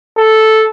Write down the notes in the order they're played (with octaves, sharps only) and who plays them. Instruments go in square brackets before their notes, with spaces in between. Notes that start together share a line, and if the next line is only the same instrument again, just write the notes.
[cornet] A4